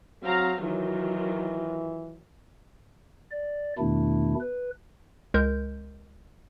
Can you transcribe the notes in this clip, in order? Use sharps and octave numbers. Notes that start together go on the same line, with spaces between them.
F#3 C4 F5 A#5
D#3 E3 F#3 F4
D5
E2 B2 D#3 A3 D4 E4
B4
C#2 G#3 A#4 G6